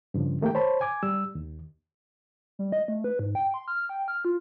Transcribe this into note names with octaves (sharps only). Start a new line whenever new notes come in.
G2 C#3 F3
D#3 A3 A#3 G4 G5
C5 C#5 A5 B5
G#5 D6 G#6
G3 E6
D#2
G3
D#5
A3
B4
G#2
G5
C6
F6
G5
F6
F4